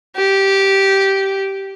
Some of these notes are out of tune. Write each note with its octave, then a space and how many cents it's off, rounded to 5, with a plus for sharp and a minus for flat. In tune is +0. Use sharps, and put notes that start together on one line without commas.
G4 -10